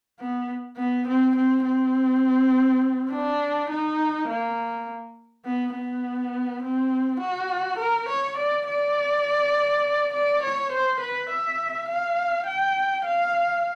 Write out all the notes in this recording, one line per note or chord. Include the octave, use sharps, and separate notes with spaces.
B3
B3
C4
C4
C4
D4
D#4
A#3
B3
B3
C4
F#4
A#4
C#5
D5
D5
D5
C#5
C5
B4
E5
F5
G5
F5